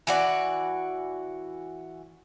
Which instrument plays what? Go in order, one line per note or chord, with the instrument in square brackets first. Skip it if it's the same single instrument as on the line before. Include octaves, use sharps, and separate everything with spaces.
[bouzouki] E3 F#4 D5